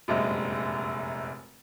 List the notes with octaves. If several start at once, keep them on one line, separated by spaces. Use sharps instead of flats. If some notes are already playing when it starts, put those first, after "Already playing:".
F1 A#1 F#2 G#3 E5